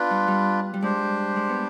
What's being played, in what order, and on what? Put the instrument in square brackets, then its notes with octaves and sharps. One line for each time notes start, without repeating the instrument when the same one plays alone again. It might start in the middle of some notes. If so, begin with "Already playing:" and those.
Already playing: [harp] B3 [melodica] D4 F4 B4
[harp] G3
G3
G3
[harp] G#3 [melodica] D4 G4 C5
[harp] G#3
B3